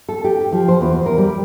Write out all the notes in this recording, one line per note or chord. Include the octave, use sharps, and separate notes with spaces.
A4
G4
F3
C5
E2
A#4
G3